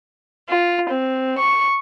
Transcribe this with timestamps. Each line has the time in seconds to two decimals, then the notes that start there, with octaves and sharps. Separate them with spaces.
0.48 F4
0.89 C4
1.39 C#6